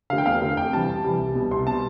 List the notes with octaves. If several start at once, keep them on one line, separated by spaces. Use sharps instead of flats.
D3 A3 F5
G5
E2 F5
D3 A3
F2 G5
C3 E3 G3 A5
F2
C3 E3 G3
C2
B2 G3
C2 C6
B2 G3 A5